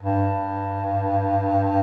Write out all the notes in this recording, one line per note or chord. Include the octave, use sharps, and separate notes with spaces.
G2